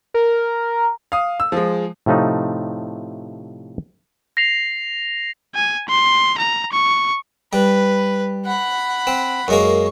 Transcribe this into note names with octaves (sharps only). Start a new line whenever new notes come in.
A#4
F5 D#6
E6
F3 G#3
A2 C3 F3 A3 D#4
A#6 C7 F7
G#5
C6
A#5
C#6
G3 B4
F#5 B5
C4
F#2 G#3 A#3 C#6